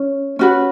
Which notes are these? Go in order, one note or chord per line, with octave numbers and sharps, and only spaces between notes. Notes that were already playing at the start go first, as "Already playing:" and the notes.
Already playing: C#4
C#4 F#4 B4